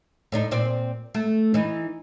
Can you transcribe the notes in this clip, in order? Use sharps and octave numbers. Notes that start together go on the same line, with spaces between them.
A2 D4 D#4
A#2 C4 D5
A3
E3 D#4